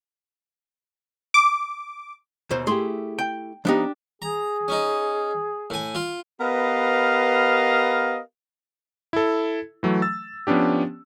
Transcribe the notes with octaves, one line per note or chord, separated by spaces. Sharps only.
D6
D#2 B2 C5
A3 E4 G4 G#4 C6
G5
F3 B3 D4 D#4 G4
G#4 A#5
C#4 D#4
A2 G#5
F4
B3 G4 A#4 B4 D#5 F5
E4 A4
E3 F#3 A3
E6 A6
F3 B3 C#4 D4 G4